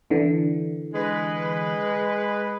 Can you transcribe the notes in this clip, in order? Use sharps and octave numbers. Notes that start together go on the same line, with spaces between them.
D3 E3
G#3 B4